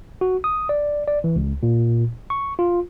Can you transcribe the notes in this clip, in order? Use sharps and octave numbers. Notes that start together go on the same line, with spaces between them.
F#4
D#6
D5
D5
E3
C#2
A#2
C#6
F4